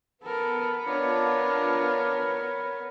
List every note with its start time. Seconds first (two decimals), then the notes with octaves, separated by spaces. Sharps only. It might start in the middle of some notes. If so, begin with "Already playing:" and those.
0.24 B3 A4 A#4
0.85 D4 F4 A#4 C#5